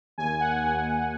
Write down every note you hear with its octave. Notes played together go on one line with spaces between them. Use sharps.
D#2 G#5
F#5
D#2 G#5
F#5